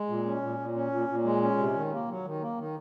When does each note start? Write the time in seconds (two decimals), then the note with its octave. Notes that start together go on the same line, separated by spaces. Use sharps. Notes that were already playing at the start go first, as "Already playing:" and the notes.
Already playing: G#3
0.09 A#2
0.26 C#4
0.41 A#2
0.59 A#2
0.75 C#4
0.92 A#2
1.08 A#2
1.24 G#3
1.42 C#4
1.58 C3
1.74 D#3
1.92 A#3
2.08 F#3
2.25 D#3
2.41 A#3
2.58 D#3